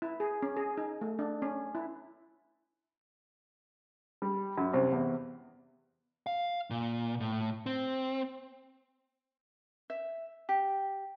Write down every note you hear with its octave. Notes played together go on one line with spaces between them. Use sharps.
E4
G#4
C#4
G#4
D#4
A3
D4
C#4
E4
G3
F#2
C2
E2
F5
A#2
A2
C4
E5
G4